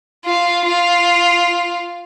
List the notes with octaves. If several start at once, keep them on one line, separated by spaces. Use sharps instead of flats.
F4
F4